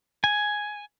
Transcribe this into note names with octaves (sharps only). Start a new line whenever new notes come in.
G#5